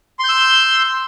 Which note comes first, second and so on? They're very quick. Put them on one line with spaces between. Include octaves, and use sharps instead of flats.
C6 G6 E6